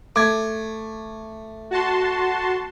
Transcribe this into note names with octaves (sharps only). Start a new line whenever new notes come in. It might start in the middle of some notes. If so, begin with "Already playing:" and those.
A3 D6 G#6
F#4 A5 C6